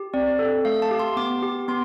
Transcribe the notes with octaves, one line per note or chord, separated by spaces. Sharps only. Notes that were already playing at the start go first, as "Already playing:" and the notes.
Already playing: G4
C4 D5
A4
A3 F5
A5
G4
C6
B3 D6
G4
B3 C6